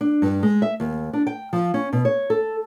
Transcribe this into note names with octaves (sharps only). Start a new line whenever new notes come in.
D4
G2
G#3
E5
D#2
D4
G5
F3
C#4
B2
C#5
A4